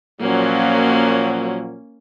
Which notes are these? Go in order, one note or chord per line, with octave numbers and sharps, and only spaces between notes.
A#2 F3 F#3 A#3 C#4